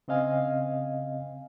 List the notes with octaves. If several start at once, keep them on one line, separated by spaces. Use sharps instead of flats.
C#3 C4 D#5 F5 G#5